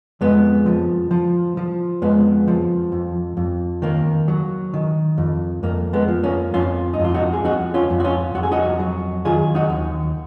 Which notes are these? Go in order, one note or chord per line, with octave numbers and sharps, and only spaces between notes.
F2 G#3 B3
F3
F3
F3
F2 G#3 B3
F3
F2
F2
D#3 A#3
F#3
D#3
F2
F2 A#3
G#3 B3
F3
A#3 C#4
F2 C#4 F4
D#4
F2 F4
D#4 F#4
G#4
F2 D#4 F#4
C#4 F4
F2
F#4
C#4 F4
F2 F#4
G#4
D#4 F#4
F#3
D#3 F4 G#4
D#4 F#4
D#2